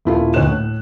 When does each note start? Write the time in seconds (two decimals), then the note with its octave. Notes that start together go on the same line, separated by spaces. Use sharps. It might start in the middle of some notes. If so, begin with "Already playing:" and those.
0.05 D#1 E4 F4 A4
0.34 D2 C#5 D#5 F#6 E7
0.45 A2